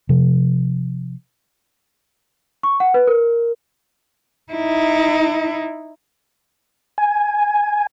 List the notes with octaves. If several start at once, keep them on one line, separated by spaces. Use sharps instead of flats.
C3 F3
C#6
F#5
B4
A#4
D#4 E4
G#5